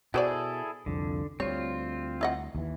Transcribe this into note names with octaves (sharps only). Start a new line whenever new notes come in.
B2 E4 F#4 G#4 A4 C5 D5
C2 F2 D3
D2 G3 C4 F4 C#5
E4 D#5 F#5
D#2 E3